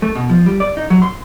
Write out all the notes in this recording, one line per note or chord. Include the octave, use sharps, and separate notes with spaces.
A3
B2
F3
G3
D5
D#4
F#3
C6